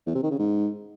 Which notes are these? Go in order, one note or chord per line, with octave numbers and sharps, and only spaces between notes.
E2
C3
D#3
C#3
G#2